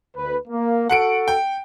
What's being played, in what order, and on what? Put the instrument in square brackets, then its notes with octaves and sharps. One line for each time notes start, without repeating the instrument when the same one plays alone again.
[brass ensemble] D2 B4
A#3
[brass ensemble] F#4 A4 [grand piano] F#5 C#7 D7
[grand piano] G5